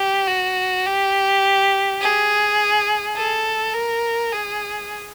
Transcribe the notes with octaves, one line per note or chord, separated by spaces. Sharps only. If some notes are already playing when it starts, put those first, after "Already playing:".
Already playing: G4
F#4
G4
G#4
A4
A#4
G#4